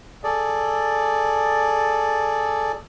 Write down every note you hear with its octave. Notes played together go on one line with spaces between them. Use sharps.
G#4 A4 D5